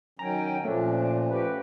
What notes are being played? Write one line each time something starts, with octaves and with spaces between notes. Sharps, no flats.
D#3 F#3 C#4 G5 G#5 A#5
A#2 F3 A3 C#4 D4
F#4 G4 B4